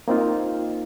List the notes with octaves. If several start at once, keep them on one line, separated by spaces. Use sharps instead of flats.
A#3 C4 D#4 F4